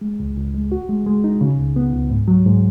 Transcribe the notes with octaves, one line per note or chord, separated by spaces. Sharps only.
G#3
C#2
C#2
G#3
F#4
G#3
G#3
D#4
C#3
C#2
B3
C#2
G#2
F#3
G#2